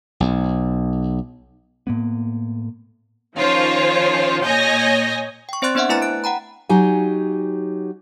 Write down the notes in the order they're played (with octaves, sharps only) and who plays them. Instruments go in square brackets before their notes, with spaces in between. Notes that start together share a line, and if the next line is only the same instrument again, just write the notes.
[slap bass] B1
[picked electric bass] A2 A#3 B3
[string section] D#3 F3 C#4 F4 C5 C#5
A#2 C#5 D#5 G#5 G6 A#6
[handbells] G5 C#6
C4 C5 D5 C6 F#6 A6
B3 D4 C5 D#5 E5 F#5
A3 E4 B4 G#5 A#5 A6
F#6 D7
F#5 G5 A#5 B5
[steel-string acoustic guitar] F#3 D#4 G4 G#5